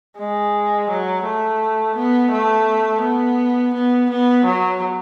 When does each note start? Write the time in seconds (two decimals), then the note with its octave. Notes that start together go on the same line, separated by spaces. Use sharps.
0.18 G#3
0.90 F#3
1.24 A3
1.96 B3
2.32 A3
3.03 B3
3.74 B3
4.10 B3
4.45 F#3